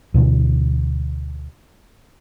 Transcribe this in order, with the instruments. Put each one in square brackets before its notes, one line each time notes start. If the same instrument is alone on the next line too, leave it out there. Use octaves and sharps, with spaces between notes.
[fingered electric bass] D2 B2 D3 E3